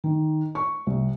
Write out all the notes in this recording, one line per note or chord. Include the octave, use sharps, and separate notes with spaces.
D#3
C#6
C2